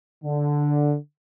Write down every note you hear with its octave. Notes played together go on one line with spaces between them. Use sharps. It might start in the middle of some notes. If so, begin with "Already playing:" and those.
D3